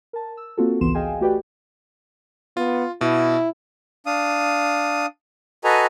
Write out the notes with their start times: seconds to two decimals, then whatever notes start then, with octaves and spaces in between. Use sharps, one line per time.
0.13 A#4 A5
0.37 E6
0.57 A#3 C4 F4 F#4 A4
0.81 G#1 C#2 E3 B3 C6 E7
0.95 G#4 D#5 F5 G5 G#5
1.21 A3 F#4 G4 B4 D5 G5
2.57 B3 F4
3.01 B2 E4
4.06 D4 F5 D#6
5.64 F#4 A4 B4 D#5 G#5 A#5